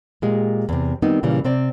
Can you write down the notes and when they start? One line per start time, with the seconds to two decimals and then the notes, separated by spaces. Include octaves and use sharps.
0.22 A#2 G#3 G4
0.69 E2 C3
1.02 D#3 G3 B3 C4 D#4
1.23 A#2 C#3 E3 G3
1.44 C3 C4 D5